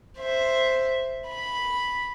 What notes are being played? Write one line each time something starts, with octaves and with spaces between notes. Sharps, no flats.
C5 E5
B5